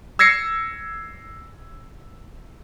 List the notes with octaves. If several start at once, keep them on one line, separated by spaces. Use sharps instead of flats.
E6 G#6 A#6 C7 C#7